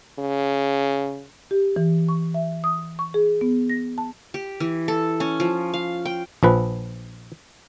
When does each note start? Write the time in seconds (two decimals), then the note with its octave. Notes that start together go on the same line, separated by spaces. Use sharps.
0.19 C#3
1.51 G4
1.76 E3
2.09 C#6
2.34 E5
2.64 D#6
2.99 C#6
3.14 G#4
3.41 B3
3.70 A#6
3.98 A5
4.34 G4
4.60 E3
4.88 A4
5.20 C#4
5.40 F3
5.74 F5
6.05 G5
6.43 A#1 F3 B4